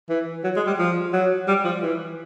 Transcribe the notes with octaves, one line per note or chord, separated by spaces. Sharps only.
E3
F#3
G#3
G3
F3
F#3
G3
F3
E3